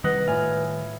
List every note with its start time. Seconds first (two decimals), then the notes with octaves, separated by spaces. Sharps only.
0.04 C2 D#3 G3 B4 D#5 F#5
0.28 A2 F4 G#5